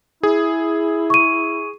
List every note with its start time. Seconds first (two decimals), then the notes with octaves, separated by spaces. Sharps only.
0.23 E4 G#4
1.10 C#6 D#7